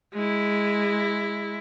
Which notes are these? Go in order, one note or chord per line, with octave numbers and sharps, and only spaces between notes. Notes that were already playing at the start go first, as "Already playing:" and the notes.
G#3 E4